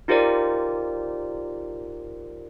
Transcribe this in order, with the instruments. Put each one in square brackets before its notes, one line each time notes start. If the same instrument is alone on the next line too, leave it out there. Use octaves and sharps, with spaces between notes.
[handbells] D#4 F4 G4 A#4 C5 D5